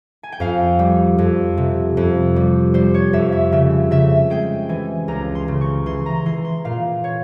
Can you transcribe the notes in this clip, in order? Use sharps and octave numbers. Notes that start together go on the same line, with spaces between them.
G#5
G5
F2 F5
G3
F2
C3
F2
G3
G3 C5
C#5
F2 E5
E5
C#3 E5
C#3 E5
G#3 G5
E3 G#5
C#2 A#5
C6
C#3
C#6
E3 C6
A#5
E3 C6
C6
A#2 F5
C#5